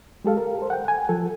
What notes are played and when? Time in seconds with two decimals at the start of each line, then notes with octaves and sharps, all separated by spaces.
0.25 G#3 G4 A4 F5
0.37 A#4
0.58 A4 C5
0.70 F#5 G5
0.88 G#5
1.09 F3 A4